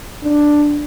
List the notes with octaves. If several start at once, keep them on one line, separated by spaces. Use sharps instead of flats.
D4